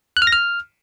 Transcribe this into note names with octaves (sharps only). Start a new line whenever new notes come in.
F#6
F6
A#6
F6